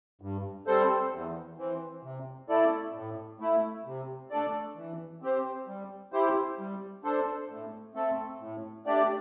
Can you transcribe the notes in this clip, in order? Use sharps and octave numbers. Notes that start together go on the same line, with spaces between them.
G2
G3 C4 A4 C5
E2
E3 C4
C3
A3 E4 A4 D5
A2
A3 E4
C3
A3 D4 A4 D5
E3
C4 G4 C5
G3
E4 G4 C5
G3
D4 A4 C5
A2
A3 C4 A4
A2
A3 D4 G4 D5